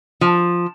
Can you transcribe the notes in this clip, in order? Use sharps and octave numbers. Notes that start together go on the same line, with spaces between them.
F3